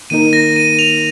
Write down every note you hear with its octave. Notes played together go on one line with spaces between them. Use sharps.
D#3 A#3 D#4 A#4 D#7
A#6
D#7
F7